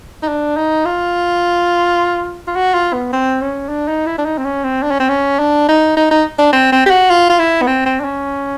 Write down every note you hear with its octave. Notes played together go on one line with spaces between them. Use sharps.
D#4
D4
D#4
F4
F4
F#4
F4
B3
C4
C#4
D4
D#4
E4
D4
D#4
C4
C#4
C4
D4
C#4
C4
C#4
D4
D#4
D#4
D#4
D4
C4
C4
G4
F#4
F4
F4
E4
B3
C4
C4
D4
C#4